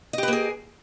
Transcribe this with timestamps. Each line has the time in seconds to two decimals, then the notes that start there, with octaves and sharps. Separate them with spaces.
0.13 D#5
0.18 G4
0.23 B4
0.28 A#3
0.33 G#4